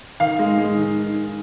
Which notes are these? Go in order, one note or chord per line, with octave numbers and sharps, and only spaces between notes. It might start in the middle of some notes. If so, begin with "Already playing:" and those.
D#3 F5
G#3
G#3
D#3